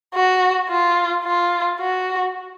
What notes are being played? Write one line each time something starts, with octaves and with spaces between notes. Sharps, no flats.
F#4
F4
F4
F#4